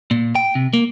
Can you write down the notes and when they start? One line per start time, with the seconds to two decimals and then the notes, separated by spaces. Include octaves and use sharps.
0.11 A#2
0.35 G5
0.55 C3
0.73 A#3